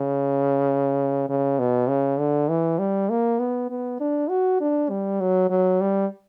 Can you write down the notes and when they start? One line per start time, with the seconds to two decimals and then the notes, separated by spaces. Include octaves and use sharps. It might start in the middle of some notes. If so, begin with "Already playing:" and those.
Already playing: C#3
1.29 C#3
1.59 B2
1.88 C#3
2.19 D3
2.50 E3
2.79 G3
3.10 A#3
3.40 B3
3.70 B3
4.00 D4
4.29 F#4
4.61 D4
4.90 G3
5.21 F#3
5.50 F#3
5.81 G3